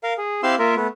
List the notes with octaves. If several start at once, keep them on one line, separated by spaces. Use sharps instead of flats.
A#4 F5
G#4
C4 E4 G4 F5 C6 E6
A#3 F4 A#4 E5
A3 B3